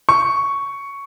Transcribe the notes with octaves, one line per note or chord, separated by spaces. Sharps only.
C#6